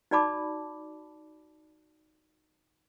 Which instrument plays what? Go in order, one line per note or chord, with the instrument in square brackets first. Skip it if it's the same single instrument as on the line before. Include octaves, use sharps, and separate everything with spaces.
[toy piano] D#4 F#4 D5 A5 B5 D6